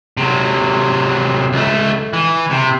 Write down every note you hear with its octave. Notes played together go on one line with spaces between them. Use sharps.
C3 F#3
C#2 A3
E3
C3